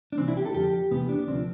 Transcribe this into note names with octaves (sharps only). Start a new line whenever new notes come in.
D4
C2 C3 E3 C4
E4
G4
A4
F2 D3 F3 G4
E2 C3 E3 B3
D4
D2 C3 F3 C4